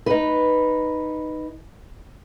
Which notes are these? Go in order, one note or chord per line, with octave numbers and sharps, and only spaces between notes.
D#4 B4